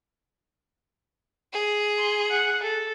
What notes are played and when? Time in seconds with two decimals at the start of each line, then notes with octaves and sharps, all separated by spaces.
1.53 G#4
1.98 C6
2.30 F#5
2.63 A4